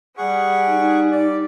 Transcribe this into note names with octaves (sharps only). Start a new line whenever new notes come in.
G3 G#4 F#5 C#6
D#4
D5